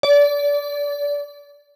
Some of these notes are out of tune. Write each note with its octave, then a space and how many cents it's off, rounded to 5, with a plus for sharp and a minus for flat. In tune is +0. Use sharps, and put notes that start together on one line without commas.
D5 -25